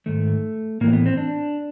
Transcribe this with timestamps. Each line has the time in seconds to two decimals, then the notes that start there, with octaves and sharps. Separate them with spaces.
0.06 G#2 D#3 A3
0.81 A2 E3 A#3
0.93 B3
1.06 C4
1.17 D4